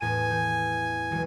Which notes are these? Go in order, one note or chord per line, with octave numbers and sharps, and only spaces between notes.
E2 A2 G#5 D#7
E3 G6
B1 E3 G#3